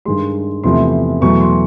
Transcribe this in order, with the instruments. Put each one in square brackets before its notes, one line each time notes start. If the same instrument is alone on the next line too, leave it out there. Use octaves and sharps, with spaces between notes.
[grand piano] G2 D#3 G#3 C6
E2 C3 F3 A3 C6
E2 B2 F#3 A3 C#6
C6